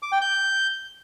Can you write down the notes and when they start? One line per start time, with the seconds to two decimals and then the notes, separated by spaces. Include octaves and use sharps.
0.02 D6
0.12 G5
0.21 G6